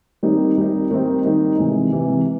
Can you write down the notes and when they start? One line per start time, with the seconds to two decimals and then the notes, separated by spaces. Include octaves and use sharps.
0.23 D#3 G3 C4 D#4
0.57 D#3 G3 C4 D#4
0.91 D#3 G3 C4 D#4
1.25 D#3 G3 C4 D#4
1.59 C3 E3 G#3
1.92 C3 E3 G#3